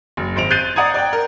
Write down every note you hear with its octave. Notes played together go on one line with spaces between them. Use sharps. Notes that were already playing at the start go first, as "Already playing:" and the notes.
F#1
G#1 C5 D7 F7
F#6 G6 A6 C7 D#7
D5 F#5 A#5 D#6 G#6
D5 G5
A#4